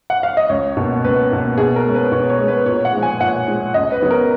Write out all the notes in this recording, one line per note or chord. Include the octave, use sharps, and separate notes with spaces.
F#5
F5
D#5
C#2 C#5
B2 A#3
C#2 B4
B2 A#3
B2 G#4
A#4
G#3 C#4
B4
B2 C#5
C#5
G#3 C#4
B4
A#2 C#5
F#5
F3 G#3
G#5
A#2 F#5
F3 G#3
C#2 D#5
B4
C#3 F#3 B3
A#4